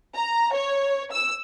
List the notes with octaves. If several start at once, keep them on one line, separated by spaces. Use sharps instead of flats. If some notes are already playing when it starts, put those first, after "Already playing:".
A#5
C#5
E6